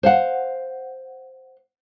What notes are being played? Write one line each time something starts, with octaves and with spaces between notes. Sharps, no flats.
C5 F5 F#5